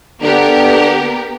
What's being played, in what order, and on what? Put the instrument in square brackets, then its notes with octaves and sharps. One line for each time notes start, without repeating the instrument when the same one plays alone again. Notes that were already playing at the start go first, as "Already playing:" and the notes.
[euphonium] D3 [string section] B3 G4 A#4